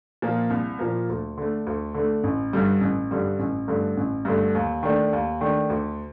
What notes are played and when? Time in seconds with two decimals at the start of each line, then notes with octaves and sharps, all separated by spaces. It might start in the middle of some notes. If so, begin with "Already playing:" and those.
0.22 A#2 F3 A#3
0.50 C2
0.79 A#2 F3 A#3
1.09 D2
1.37 D3 A3
1.66 D2
1.94 D3
1.99 A3
2.24 A1
2.53 G2 D3 G3
2.81 A1
3.11 G2 D3 G3
3.39 A1
3.68 G2 D3 A3
3.97 A1
4.25 G2 D3 A3
4.55 D#2
4.83 D#3 A3 D4
5.13 D#2
5.41 D#3 A3 D4
5.70 D2